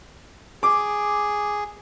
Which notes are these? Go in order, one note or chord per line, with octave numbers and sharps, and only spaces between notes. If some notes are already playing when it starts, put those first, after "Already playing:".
G#4 D6